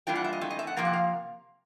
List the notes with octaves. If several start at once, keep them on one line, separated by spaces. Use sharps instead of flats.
E3 G3 A#3 D4 F4 G5
F#5
E5
D#5
E3 A3 C4
D#5
E5
F#5
C3 F3 A#3 F5
F#5
F5